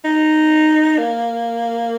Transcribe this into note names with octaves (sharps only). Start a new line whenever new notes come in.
D#4
A#3